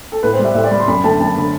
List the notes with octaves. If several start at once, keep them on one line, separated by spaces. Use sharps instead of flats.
A4
A2 B4
C5
G3
E5
A2 E5
D5
G3 B5
C6
F#2 B5
D3 A3 A5
F#2 A5
D3 A3 B5